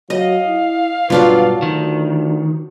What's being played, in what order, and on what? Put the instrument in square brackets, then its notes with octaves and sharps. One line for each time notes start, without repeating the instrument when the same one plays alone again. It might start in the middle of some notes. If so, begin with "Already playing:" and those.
[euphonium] F#3 [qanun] D#5 [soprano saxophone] F5
[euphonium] E4
[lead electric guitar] B1 G2 [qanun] F#3 D4 F4 [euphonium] B4
[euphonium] D2 [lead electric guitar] D#3